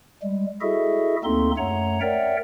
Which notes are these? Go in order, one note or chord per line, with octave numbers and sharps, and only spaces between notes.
G3 G#3
E4 F#4 G#4 A4 D#5 E5
D2 A#3 C4 D#4 A4 C6
F#2 A3 C#5 F#5 A#5
A#4 C#5 D5 E5 F#5 G5